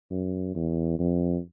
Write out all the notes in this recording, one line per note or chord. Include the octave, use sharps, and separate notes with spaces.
F#2
E2
F2